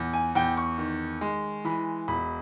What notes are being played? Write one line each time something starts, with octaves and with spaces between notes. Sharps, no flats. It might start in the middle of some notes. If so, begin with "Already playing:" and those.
Already playing: E2
G#5
E2 G5
C#6
D#3
G#3
E3 B5
E1 B5